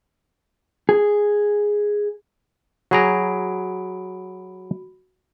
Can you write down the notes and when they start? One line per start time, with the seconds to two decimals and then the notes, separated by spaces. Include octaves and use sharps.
0.89 G#4
2.91 F#3 F#4 G#4 A#5 B5 D7